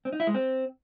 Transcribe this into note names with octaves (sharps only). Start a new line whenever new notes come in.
C4
D#4
E4
G#3
C4